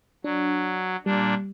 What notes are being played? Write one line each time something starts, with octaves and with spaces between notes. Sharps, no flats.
F#3 D4
A#2 G3 D4